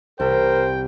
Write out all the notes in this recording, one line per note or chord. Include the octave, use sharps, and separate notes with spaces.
C2 A#4 C5 E5 G5